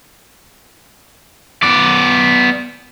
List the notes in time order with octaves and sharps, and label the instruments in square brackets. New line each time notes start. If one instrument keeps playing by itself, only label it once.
[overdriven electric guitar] B3 D5